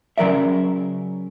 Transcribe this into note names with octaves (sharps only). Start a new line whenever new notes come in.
C#3 F#3 A#4 D5 E5